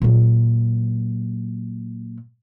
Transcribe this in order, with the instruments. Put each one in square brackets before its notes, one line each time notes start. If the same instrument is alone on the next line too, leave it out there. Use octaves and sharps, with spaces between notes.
[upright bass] A#2 F#3